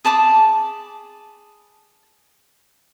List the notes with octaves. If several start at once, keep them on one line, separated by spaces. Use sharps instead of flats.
G#4 A5 B5 D6